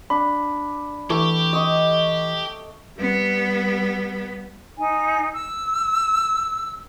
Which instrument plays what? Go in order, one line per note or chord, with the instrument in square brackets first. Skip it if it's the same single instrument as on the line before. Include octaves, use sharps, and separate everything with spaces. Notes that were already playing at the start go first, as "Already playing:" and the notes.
[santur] D4 [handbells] B5
[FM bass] E3 [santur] A3 [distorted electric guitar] G4
[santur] D#5 C#6
[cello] G3 B3
[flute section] D#4 G#5
E6